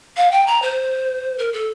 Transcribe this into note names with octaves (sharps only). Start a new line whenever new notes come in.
F5
G5
A#5
C5
A#4
A4